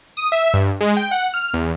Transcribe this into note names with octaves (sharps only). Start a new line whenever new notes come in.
D#6
E5
G2
G#3
G5
F#5
F6
E2